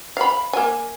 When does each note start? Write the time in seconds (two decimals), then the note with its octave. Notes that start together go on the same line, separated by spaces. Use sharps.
0.17 F5 B5
0.53 A#3 G#5